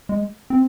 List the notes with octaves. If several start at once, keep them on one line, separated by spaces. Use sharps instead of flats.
G#3
C4